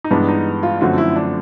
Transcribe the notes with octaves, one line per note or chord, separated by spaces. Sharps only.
D#4
G2 E3 G#3 B3 D4
D#4
F4
F#2 D3 F3 A3 C4 F#4
E4
D4